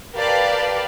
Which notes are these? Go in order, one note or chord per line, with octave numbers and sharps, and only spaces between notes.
G4 A#4 B4 D5 F5 A5